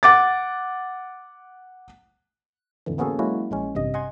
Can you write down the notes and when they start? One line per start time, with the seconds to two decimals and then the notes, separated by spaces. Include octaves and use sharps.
0.03 F#5 D6 A6
2.86 F2 A2 D3 E3
2.98 A#3 B3 C#4 F#4 G#4 A4
3.19 F#3 G#3 A#3 C#4 E4 F#4
3.51 A#1 G#3 C#4
3.75 A1 G2 C3 D#5
3.94 D#5 F#5 G#5 C6 G#6